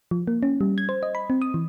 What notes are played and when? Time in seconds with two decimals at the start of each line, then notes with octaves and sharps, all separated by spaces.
0.11 F3
0.27 A#3
0.43 C#4
0.61 G3
0.78 G#6
0.89 C5
1.03 D#5
1.15 B5
1.30 C4
1.42 D#6
1.54 E3